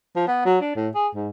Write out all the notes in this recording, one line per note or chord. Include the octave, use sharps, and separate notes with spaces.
F3
B3
F#3
D4
A2
G#4
G#2